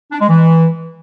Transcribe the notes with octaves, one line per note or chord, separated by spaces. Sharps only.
D4
G#3
E3